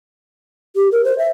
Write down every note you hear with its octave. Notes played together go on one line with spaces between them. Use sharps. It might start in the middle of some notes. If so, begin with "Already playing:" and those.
G4
A#4
C5
E5